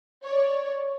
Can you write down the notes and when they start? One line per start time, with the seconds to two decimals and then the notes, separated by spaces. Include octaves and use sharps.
0.24 C#5 D5